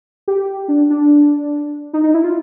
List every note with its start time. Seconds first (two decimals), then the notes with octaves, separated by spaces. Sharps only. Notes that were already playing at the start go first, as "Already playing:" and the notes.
0.28 G4
0.68 D4
0.90 D4
1.93 D#4
2.03 D#4
2.14 E4
2.24 F4